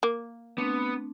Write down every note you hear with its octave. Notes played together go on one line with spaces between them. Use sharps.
A#3
A3 B3 C4 D4